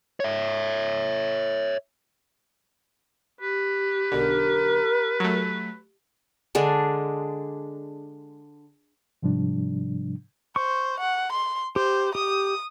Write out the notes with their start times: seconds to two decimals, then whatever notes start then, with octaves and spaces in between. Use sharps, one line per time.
0.20 C#5 E5
3.41 G4 B4
4.12 B1 D3 A#4
5.20 F#3 A3
6.55 D3 G#3 D4 G#4
9.23 G#2 C3 F3 G3 D4
10.56 C5 C#6
11.00 F#5
11.32 C6
11.76 G4 C5
12.15 G4 D#6